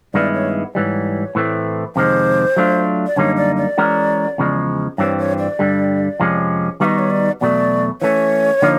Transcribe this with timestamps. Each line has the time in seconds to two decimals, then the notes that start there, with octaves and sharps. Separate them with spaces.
0.14 G2 D#3 G#3 B3 E4 D5
0.34 C#5
0.74 G#2 E3 G3 C#5
1.35 A2 E3 A3 C4
1.96 F2 C3 D#3 G#3 C5
2.57 F#3 A3 D4 F4
3.07 D5
3.16 F#2 D3 G3 A#3 D#4 C#5
3.37 D5
3.57 D5
3.78 E3 G#3 C#4 F#4 A#4
4.38 E2 C#3 F3 G#3
4.98 G2 E3 G3 C4 C#5
5.19 C#5
5.39 D5
5.59 G2 D3 G3
6.20 F2 C3 F3 G#3 C#4
6.80 D#3 G3 B3 D#4 F#4 D#5 F5
6.99 C#5
7.10 D5
7.41 E2 B2 F#3 A3 D5
8.01 E3 A3 C#4 C#5
8.62 D3 F3 A#3 D#4